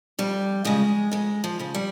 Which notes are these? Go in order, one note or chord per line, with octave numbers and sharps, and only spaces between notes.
F2 G3
C#3 F3 G#3
F2 G#3
F3
C#3 F3
G3